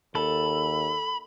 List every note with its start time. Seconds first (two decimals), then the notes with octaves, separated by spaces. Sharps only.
0.15 D#2 A4 B5